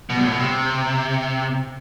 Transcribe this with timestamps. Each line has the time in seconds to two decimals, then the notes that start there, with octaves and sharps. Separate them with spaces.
0.10 B2
0.17 G2
0.24 A2
0.32 B2
0.40 C3